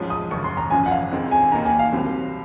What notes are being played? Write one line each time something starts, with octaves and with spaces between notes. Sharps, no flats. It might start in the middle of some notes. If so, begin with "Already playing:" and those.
Already playing: G#2 F3 G#3 C#4
D#6
F#1 F#2 C#3 C#6
C6
A#5
G#1 F#2 C#3 F3 G#5
F#5
F5
F2 D#3 G#3 C4
G#5
D#2 D#3 A#3 D#4 A#5
G#5
F5
C2 C3 F#3 C4